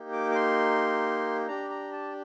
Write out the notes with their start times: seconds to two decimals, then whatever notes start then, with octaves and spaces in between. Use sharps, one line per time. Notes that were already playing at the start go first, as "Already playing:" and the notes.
Already playing: A#3 D#4 G4
0.13 D6
0.32 D6
0.36 C6
1.48 D4 G4 A#5
1.70 A#5
1.93 A5